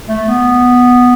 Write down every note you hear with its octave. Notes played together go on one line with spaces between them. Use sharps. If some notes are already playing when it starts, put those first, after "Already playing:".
A3
B3